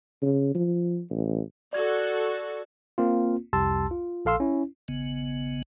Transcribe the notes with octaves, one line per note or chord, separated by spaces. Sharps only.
C#3
F3
A1
F#4 A4 D5 G#6
A#3 C4 F4
C2 F2 G4 A5 C6 E6
F4
A#1 A4 F5 C6 E6
C#4 E4
G#1 C#3 B3